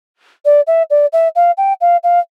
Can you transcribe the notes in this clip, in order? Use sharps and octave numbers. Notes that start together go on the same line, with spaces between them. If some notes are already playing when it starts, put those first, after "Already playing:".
D5
E5
D5
E5
F5
G5
F5
F5